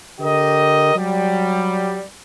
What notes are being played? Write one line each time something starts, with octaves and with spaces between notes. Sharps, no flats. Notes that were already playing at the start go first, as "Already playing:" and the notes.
D3 G4 A#4 D#5
F#3 G3